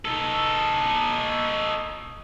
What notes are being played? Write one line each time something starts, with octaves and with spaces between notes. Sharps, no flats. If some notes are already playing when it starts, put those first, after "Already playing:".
D#4 A4